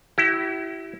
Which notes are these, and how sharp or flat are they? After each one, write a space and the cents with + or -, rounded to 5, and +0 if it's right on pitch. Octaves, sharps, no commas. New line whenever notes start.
E4 +0 G4 -45